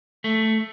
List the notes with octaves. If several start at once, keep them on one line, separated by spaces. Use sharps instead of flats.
A3